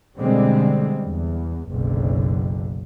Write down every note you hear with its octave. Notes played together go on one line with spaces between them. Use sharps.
B2 D3 G3 G#3 C4
E2
F#1 B1 D3